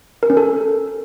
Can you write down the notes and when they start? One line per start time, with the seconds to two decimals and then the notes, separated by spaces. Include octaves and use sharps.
0.23 A#4
0.30 C#4
0.37 A4